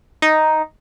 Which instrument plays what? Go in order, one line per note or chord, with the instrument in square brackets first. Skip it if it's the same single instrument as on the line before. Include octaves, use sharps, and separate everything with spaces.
[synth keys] D#4